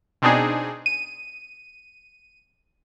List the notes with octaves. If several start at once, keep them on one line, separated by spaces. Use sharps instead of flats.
B2 C4 D4 D#4 G#4
D#7